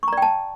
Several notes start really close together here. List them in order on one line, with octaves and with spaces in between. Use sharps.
C#6 A#5 D5 G5 A5